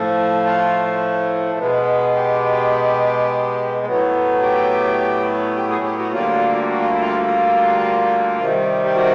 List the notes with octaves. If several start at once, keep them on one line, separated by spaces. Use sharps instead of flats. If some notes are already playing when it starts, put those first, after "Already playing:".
Already playing: A2 F3 A3
F4
B2 G#3 B3
G4
A2 F#3 B3
G4
G4
G#4
G4
F#4
D2 D3 G3 A#3 F4
F#4
F4
E4
F4
F4
C3 D#3 G3
G4
F#4